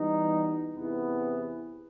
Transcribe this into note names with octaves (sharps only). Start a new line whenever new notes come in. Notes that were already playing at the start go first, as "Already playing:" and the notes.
Already playing: E3 G3 B3 D#4
E2 C3 E3 B3